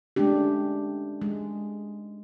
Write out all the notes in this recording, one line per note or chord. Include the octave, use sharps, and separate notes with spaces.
G#3 A3 C#4 D4 G4
G#3